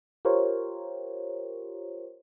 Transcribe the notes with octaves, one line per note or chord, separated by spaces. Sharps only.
F4 G4 A#4 C5 C#5